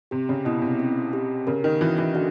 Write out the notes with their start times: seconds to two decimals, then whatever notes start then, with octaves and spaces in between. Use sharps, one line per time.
0.11 C3 G4
0.29 C#3
0.45 B2 E4
0.62 C3
0.79 C4
1.13 G4
1.47 C#3 A#4
1.64 D#3
1.81 E3 F#4
1.98 E3
2.15 D3 F#4